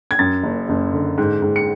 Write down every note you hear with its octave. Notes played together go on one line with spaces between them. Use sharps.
G#6
F#2 A6
F#1
F#1
D3
G#2
G#2
C#7